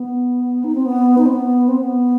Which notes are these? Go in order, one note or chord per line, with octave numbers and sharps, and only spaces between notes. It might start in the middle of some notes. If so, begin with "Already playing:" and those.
Already playing: B3
D#4
C4
B3
D#4
C4
B3
C4
B3